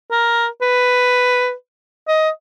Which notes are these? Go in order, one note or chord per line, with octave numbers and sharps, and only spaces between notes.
A#4
B4
D#5